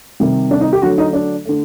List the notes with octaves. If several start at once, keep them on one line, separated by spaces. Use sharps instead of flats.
C3 D#3 G3
D4
D#4
G4
D3 F#3 A3 F#4
D#4
D4
D3 A3